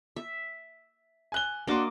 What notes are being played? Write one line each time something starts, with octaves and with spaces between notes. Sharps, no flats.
E5
G#5 F#6 G7
A#3 D4 F#4 D#5 C6 D6